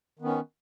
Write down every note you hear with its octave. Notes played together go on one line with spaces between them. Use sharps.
D#3 B3 C#4